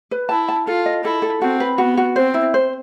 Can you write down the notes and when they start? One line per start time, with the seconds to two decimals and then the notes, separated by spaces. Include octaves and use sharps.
0.11 B4
0.29 E4 A5
0.49 A5
0.67 F4 A4
0.86 D#5
1.04 E4 A4
1.22 A4
1.42 C4 F#4
1.60 B4
1.78 B3 F#4
1.97 F#4
2.16 C4 C5
2.34 E4
2.54 C5